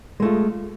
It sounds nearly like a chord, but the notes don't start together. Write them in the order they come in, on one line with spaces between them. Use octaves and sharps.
G#3 A3 F4